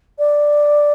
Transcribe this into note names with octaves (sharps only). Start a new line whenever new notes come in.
D5